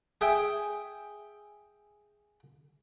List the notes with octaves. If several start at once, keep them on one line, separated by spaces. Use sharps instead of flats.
G#4 E5 G5 G#5